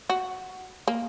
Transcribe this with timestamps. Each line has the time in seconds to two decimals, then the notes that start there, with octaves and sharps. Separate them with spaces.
0.09 F#4
0.88 A#3